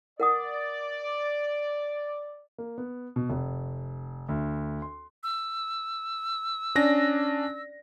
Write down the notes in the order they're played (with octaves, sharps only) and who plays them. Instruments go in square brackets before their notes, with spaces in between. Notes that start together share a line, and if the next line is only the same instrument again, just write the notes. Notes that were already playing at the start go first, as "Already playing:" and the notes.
[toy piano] A#4 F#5 D#6 [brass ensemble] D5
[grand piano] A#3
B3
B2
F1
D2
C6
[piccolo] E6
[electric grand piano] C#4 D4 A#6 [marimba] D5